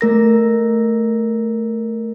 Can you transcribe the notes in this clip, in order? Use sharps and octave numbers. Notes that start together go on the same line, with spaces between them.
A3 A#4 A#6